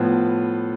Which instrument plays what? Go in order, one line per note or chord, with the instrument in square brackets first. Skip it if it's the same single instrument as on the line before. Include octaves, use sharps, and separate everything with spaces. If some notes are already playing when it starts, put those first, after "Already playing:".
Already playing: [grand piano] A2 F3 B3 F4